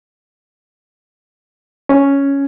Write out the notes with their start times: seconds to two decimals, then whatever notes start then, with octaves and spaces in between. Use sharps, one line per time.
1.89 C#4